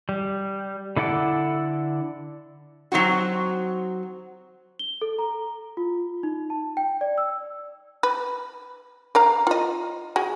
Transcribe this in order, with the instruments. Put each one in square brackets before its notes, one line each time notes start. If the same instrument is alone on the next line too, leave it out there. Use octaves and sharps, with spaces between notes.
[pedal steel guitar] G3
D3 E4 A4 F#5 D6
[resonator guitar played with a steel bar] F#3 C4 D#4 F#4
[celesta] G7
A4
A#5
F4
D#4
A5
G5
D5
E6
[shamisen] B4
A#4 F5 A#5
F4 D#5
F#4 G#4